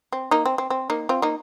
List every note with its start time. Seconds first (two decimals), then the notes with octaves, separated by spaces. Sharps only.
0.13 C4
0.31 A#3 D#4
0.46 C4
0.58 C4
0.70 C4
0.90 A#3 D#4
1.09 C4 F4
1.22 A#3 D#4